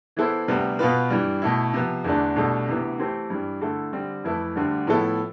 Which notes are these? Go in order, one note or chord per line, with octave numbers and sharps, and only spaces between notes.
E3 B3 E4 A4 C5
D2 C3 G3 B3
B2 B3 F4 B4
G2 E3 G3
B2 A3 E4
C3 F3 B3
E2 D3 A3 D4
C2 B2 A3 D4 A4
D2 C3 E3 B3
E3 A3 C4 G4 C5
G2 E3 G3
D3 A3 E4 A4
D3 G3 C4
F2 E3 A3 E4 B4
D2 D3 G3
A2 F3 B3 E4 A4